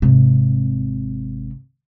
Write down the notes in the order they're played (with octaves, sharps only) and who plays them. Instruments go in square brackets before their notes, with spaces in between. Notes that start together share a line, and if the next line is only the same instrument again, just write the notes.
[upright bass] G#1 C3